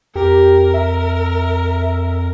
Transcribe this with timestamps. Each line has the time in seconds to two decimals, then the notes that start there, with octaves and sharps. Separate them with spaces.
0.15 F2 G4 A#4
0.74 E5